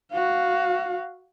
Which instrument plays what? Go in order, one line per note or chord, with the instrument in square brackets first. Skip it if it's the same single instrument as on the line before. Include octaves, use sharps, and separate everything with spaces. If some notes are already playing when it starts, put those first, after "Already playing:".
[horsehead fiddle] F#4 F5